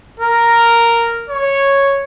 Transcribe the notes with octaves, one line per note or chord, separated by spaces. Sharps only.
A#4
C#5